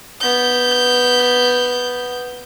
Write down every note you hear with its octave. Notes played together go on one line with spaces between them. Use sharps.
B3 G6